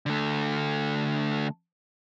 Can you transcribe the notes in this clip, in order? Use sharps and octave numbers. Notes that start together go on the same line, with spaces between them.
D3 A3